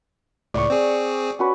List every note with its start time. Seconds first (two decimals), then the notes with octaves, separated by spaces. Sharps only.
0.54 C#2 A2 D5 C#6
0.70 C4 G#4
1.39 C#4 F#4 B4